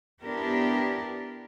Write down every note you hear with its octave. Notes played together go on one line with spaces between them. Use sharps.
B3 D4 E4 G4 A#4